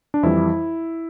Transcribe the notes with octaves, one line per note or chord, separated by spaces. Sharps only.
D4
F2 E3 G3 E4